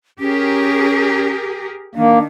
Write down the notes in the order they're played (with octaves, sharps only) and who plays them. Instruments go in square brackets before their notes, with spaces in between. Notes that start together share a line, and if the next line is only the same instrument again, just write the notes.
[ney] C#4 [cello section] G4 G#4 A#4
[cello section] D#3 [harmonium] A#3 [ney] D4